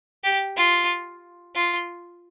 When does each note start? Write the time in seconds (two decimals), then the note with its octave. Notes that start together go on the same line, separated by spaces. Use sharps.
0.24 G4
0.57 F4
1.55 F4